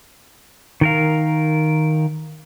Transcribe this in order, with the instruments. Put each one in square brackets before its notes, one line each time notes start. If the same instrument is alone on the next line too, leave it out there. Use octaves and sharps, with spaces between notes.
[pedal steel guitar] D#3 A#4 F5